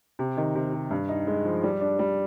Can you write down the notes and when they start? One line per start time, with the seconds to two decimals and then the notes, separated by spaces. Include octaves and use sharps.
0.19 C3
0.37 D#3
0.55 C3
0.73 C3
0.91 G2
1.09 D#4
1.27 G#3
1.45 F3
1.64 G3
1.81 D4
1.99 G3